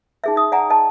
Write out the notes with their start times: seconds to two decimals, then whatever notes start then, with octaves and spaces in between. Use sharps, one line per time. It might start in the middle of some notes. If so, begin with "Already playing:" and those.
0.24 D#4 G#4 E5
0.36 D#4 D#6
0.52 D5 F#5 G#5 A#5
0.70 D#5 A5